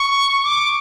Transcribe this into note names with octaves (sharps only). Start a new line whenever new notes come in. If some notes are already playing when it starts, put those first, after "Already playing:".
Already playing: C#6
D6